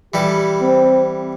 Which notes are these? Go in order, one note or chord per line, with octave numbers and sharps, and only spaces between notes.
E3 G3 G4 A4
C4